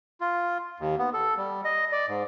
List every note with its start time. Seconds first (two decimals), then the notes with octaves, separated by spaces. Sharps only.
0.21 F4
0.80 D#2
0.98 B3
1.14 A4
1.37 G3
1.64 D#5
1.92 D5
2.08 G#2